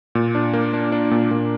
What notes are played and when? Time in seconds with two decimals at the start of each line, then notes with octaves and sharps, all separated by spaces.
0.15 A#2
0.35 D4
0.53 A#3
0.74 D4
0.92 D4
1.11 A#2
1.31 A#2